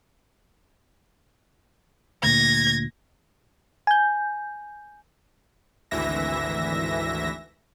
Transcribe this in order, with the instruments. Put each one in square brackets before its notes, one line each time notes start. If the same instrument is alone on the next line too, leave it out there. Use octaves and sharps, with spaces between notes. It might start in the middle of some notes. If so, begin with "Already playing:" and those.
[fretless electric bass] D2 A#2 [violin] G#6 A#6
[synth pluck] G#5 G6
[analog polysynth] G#1 D2 E3 E5 A#6